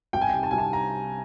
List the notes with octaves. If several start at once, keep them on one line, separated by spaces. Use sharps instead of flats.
C2 G5
G#5
G5
C3
A5
C2 G#5
A5
A#5